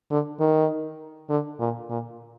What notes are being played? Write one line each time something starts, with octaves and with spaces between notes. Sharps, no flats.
D3
D#3
D3
A#2
A#2